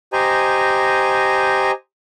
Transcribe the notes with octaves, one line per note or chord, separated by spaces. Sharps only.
G4 C5 D#5 G#5 A#5